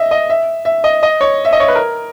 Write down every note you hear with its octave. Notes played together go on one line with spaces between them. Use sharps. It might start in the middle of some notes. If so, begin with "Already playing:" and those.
Already playing: D#5 E5
D#5
E5
E5
D#5
D#5
C#5
E5
D#5
C#5
B4
A#4